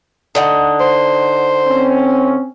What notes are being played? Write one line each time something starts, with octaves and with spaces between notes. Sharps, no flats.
D3 D#4 F#5
C5
C4 C#4